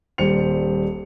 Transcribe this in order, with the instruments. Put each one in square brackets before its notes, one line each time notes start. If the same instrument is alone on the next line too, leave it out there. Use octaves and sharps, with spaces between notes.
[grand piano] D#1 G3 C5 C#7 F7